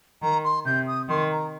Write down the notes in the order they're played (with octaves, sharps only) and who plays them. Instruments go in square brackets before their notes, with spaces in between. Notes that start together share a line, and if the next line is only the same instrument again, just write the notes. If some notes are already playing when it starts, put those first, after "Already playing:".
[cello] D#3 [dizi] A#5
[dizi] C6
[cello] C3 [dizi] G6
[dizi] D#6
[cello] D#3 [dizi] C6
[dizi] A#5